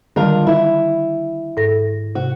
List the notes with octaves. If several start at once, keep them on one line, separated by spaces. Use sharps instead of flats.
D3 D#3 G3 D4 F4 A#4
E4
G#2 A4 A#6
C3 F#4